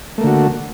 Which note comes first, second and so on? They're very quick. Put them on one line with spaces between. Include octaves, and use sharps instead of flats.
A3 A#3 D3 F#4